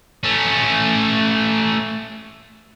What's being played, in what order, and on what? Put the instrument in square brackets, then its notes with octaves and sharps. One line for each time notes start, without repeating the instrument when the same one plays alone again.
[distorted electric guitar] A3 C#4